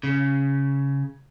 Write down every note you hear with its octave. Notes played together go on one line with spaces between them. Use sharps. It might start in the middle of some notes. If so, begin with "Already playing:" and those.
C#3